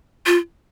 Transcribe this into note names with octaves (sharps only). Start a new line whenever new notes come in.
F4